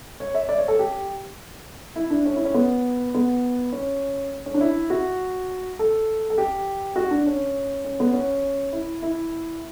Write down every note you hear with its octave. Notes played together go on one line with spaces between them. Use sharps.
C#5
E5
D5
C#5
A4
G4
E4
D4
C#4
E4
C#4
B3
B3
C#4
C#4
D4
E4
F#4
A4
A4
G4
F#4
D4
C#4
C#4
B3
C#4
E4
E4